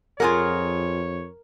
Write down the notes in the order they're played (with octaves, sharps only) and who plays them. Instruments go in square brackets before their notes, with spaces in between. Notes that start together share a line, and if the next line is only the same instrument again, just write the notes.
[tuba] F2 [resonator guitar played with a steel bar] F4 G#4 F#5 [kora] A#4 [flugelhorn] C#5